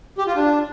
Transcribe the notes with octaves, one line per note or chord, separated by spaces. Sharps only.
G4
F4
D4